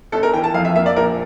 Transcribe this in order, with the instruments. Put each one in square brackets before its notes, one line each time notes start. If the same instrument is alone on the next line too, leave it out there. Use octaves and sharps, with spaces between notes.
[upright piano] G1 A4
A#4
E3 G5
A5
F2 F5
E5
A#3 E5
D5
A#1 A#4